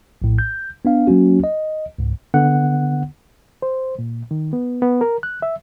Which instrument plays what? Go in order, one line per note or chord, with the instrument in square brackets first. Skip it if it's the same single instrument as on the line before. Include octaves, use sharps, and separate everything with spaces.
[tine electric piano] A#1 A2
G6
B3 D4 F5
F#3 A#3 C#4 F#4
D#5
C#2 G#2
D3 B3 F#5
[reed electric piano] C5
A#2
D#3
B3
B3
A#4
F#6
E5